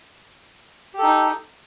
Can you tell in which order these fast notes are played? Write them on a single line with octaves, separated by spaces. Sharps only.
G4 A4 D#4